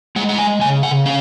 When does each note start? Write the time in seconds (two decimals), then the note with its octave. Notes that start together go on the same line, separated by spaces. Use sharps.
0.16 G#3 F#5
0.29 F#5
0.39 G#5
0.61 C#3 G#5
0.83 F#5
1.06 C#4 F5